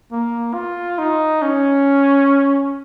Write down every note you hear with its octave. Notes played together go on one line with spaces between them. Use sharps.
A#3
F4
D#4
C#4